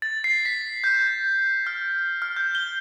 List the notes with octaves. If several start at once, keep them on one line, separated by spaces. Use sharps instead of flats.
A6
C7
B6
G6
F6
F6
G6
G7